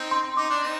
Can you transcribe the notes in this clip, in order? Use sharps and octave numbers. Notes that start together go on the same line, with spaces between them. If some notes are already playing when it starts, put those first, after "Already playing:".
Already playing: C4 D#4
C6
D#4 D6
D4
C4 D#4